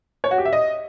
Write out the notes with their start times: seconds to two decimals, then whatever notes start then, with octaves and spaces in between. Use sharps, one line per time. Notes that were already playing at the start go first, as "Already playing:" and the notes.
0.24 C#5
0.31 F#4
0.38 G4
0.45 E5
0.53 D#5